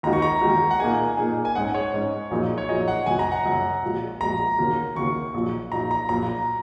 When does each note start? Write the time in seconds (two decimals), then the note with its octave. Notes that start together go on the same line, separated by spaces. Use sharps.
0.03 D#2 D#3 G#3 D#4 F#4 A#5
0.13 C#6
0.22 A#5
0.41 D#2 D#3 G#3 D#4 F#4
0.71 F#5
0.79 A#2 A#3 D#4 G#4 G#5
1.17 A#2 A#3 D#4 G#4
1.45 G#5
1.55 G#2 G#3 C#4 F#5
1.74 C#5
1.93 G#2 G#3 C#4
2.31 A#1 A#2 F#3 D#4 G#4
2.58 C#5
2.69 A#1 A#2 F#3 D#4 G#4 D#5
2.88 F#5
3.06 F#1 F#2 F#3 G#5
3.19 A#5
3.32 F#5
3.45 F#1 F#2 F#3
3.82 A#1 A#2 G#3 F#4
4.20 A#1 A#2 G#3 F#4 A#5
4.59 D#2 C#3 A#3 F#4
4.95 D#2 C#3 A#3 F#4 C#6
5.34 A#1 A#2 F#3 D#4
5.72 A#1 A#2 F#3 D#4 A#5
5.91 A#5
6.09 A#1 A#2 F#3 A#5